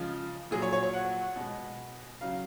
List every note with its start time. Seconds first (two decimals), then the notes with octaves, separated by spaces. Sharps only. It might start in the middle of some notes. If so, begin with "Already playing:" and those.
Already playing: C#3 F3 G#3 F4
0.51 A#2 F#3 G#4
0.62 C#5
0.72 C#5
0.83 C#5
0.94 F#5
1.36 B2 G#3
2.21 C#3 F#3 F5